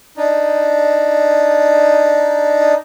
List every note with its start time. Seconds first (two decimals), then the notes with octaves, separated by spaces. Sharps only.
0.17 D4 D#4